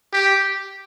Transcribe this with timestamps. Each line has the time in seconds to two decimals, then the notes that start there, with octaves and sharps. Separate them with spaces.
0.13 G4